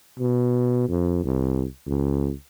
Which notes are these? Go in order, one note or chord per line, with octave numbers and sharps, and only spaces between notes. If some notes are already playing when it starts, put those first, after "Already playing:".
B2
F2
C2
C#2